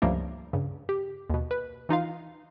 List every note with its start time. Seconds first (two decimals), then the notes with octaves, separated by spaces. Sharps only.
0.02 C#2 G2 F3 G3 A3 A#3
0.53 G2 C#3
0.89 G4
1.30 D#2 B2
1.51 B4
1.89 E3 D#4 F4 F5